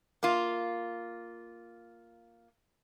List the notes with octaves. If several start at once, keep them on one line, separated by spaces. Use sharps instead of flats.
A#3 F4